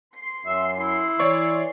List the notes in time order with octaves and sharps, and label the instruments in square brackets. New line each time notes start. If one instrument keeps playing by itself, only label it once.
[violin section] C6 C7
[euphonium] F#2 [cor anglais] E5
[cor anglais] E4
[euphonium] E3 [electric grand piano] C#5 D5 C#6